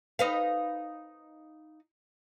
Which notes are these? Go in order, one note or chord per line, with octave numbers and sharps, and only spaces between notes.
D#4 B4 F5